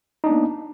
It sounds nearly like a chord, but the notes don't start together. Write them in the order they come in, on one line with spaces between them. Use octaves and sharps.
D#4 D4 B3 A#3